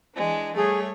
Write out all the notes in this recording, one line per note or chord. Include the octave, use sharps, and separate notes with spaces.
E3 G#3 D4
G3 A3 G#4 C#5